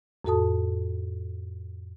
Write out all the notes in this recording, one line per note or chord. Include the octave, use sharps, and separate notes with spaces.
F2 A2 F#4 A4 A5 D#6